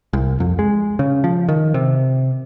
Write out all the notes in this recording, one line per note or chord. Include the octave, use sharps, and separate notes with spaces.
C2
F2
G#3
C#3
F3
D#3
C3